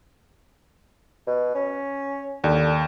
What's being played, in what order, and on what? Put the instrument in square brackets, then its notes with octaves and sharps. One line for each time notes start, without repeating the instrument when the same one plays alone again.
[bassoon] B2
C#4
[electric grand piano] D#2 [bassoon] D3